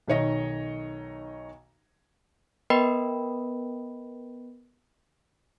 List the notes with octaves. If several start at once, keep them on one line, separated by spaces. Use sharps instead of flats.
B1 D#3 C#5 D#5 A#6
B3 A#4 B4 D#5 G5 B5